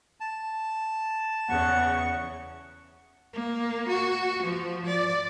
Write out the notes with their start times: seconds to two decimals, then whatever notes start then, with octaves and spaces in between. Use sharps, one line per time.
0.20 A5
1.50 E2 C#3 F#5 C#6
3.33 A#3
3.88 F#4
4.43 F3
4.86 D5